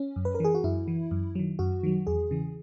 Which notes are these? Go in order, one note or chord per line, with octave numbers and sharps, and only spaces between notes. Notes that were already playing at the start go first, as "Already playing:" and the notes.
Already playing: C#4
F#2
B4
A#4
E3 G#4
F#4
F#2 E4
E3
F#2
D#3 F#3
F#2 F#4
D#3 F#3
E2 G#4
C#3 E3